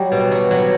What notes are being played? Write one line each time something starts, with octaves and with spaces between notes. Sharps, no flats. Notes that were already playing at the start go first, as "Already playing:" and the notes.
Already playing: F#3 G3
B2
F#3
F#3